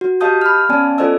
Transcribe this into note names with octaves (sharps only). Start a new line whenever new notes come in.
F#4
G4 D#5 F5 A5 D#6 G6
B5 F6
B3 C#4 D5 G#5 A5
F4 A4 C5 D5 D#5 E6